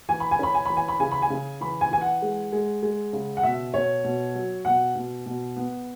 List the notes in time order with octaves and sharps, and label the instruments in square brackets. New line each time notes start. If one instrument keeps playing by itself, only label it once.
[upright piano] E3 G#5
B5
G#5
C#4 B5
G#5
E3 B5
G#5
B5
C#3 G#5
B5
G#5
C#3
E3 B5
G#5
E3 G#5
F#5
G#3
G#3
G#3
C#3
F#5
B2 E5
B2 C#5
B2
F#3
B2 F#5
B2
B2
B3